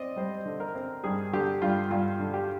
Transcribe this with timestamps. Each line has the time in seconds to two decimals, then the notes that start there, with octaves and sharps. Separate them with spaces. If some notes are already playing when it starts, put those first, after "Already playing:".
Already playing: C4 D5 D#5
0.16 G3 C5
0.45 D3
0.60 A#4
0.75 C4
1.04 G2 G#4
1.33 D3 G4
1.61 G2 F4
1.91 G2 F4
2.20 D3
2.34 G4